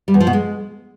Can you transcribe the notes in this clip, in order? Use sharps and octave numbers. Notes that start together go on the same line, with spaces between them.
G3
E2
F3
B2
G#3